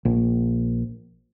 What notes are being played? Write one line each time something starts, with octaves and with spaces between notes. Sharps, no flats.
A#1